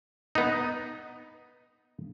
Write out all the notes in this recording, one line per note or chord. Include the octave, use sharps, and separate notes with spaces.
B3 D#4